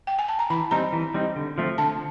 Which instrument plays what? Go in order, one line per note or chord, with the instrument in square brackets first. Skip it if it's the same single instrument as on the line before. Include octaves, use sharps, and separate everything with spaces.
[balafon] G5
G#5
A5
A#5
[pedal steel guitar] E3 [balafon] B5
[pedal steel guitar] G3 C4 D#4 [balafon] A#5
[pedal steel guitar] E3
G3 C4 D#4
D3
F3 A3 C4 F4
[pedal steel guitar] D3 [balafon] A5